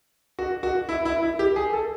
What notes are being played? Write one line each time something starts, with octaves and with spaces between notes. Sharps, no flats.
F#4
F#4
E4
E4
E4
G4
G#4
A4